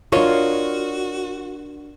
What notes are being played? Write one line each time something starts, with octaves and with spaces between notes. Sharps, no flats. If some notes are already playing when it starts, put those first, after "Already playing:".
D4 F4 F#4 A#4 C#5 D#5